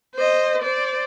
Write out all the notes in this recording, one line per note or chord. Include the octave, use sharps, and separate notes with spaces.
C5 D#5
C5 D5